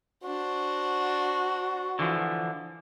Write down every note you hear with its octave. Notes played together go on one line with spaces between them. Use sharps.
D4 F#4 C5
D3 E3 F3